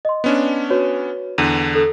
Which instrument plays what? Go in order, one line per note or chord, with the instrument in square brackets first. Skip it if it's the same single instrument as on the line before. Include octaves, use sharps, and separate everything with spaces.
[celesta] D#5 C6
[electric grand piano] B3 C#4 D4
[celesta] F#4 B4 C#5
[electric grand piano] E2 D3 [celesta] D#7
[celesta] A4